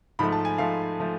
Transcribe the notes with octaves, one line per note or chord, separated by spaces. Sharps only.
G#2 F3 A3 B5
A5
G#5
G#2 F3 A3 F5
F3 A3